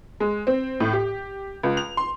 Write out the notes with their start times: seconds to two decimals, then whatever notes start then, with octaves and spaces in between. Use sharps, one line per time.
0.20 G#3
0.47 C4
0.80 A2
0.93 G4
1.63 C#2
1.77 F7
1.97 C6